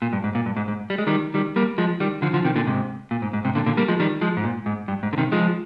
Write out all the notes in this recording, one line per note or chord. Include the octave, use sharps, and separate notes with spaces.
A#2
G2
G#2
A#2
G2
G#2
G#2
G3
G#3
D#3 G3
D#3 G3
G3 A#3
F3 G#3
D#3 G3
D3 F3
D3 F3
C3 D#3
A#2 D3
G#2 C3
A#2
G#2
G#2
G#2 C3
A#2 D3
A#2 D3
G3 A#3
F3 G#3
D#3 G3
F3 G#3
G#2
A#2
G#2
G2
G#2
D3
C3 D#3
F3 G#3